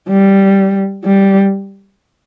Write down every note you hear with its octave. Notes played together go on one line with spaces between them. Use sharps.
G3
G3